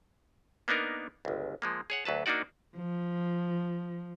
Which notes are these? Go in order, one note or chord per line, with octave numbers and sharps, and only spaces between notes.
A#3 B3 D4 D#4 A#4
G1 C#2
F3 G#3 A#3
G#4 C#5 F#5
D2 F#3 B4 A5
A#3 D4 D#4 F#4 D5
F3